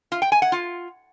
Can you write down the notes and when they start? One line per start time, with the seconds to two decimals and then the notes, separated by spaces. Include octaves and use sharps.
0.12 F4
0.22 G5
0.32 G#5
0.42 F#5
0.52 F4